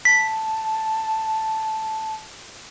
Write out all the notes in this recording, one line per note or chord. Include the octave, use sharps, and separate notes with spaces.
A5 B6